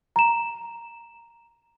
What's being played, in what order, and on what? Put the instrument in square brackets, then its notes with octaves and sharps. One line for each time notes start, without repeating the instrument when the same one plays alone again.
[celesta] A#5 E7